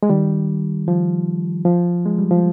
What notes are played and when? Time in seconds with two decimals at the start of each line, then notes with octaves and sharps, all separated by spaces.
0.03 G#3
0.10 D#3 G3
0.88 F3
1.65 F3
2.06 G#3
2.19 G3
2.31 F3